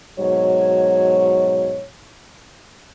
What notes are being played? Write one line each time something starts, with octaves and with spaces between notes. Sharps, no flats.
G#2 B2 F#3 C#5